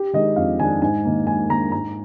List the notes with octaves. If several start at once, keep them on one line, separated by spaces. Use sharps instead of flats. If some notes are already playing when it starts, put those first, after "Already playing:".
Already playing: G4
D#3 G#3 D4 D#5
F2 F5
D#3 G#3 D4 G#5
G#2 G#5
D#3 A#3
G#2 G#5
D#3 A#3 A#5
G#2 A#5